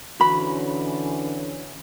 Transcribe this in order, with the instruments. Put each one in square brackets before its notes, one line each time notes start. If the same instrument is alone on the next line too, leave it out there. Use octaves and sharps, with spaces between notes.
[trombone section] D3 E3 C#4 [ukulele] F#4 B5